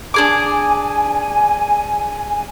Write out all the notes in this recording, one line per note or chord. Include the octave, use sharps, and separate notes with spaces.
D4 G#4 G#5 D6